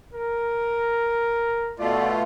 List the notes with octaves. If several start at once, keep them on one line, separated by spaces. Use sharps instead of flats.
A#4
B2 A3 F4 D5